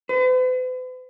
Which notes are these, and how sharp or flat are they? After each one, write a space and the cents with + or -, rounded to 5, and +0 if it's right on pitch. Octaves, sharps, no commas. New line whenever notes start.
B4 +45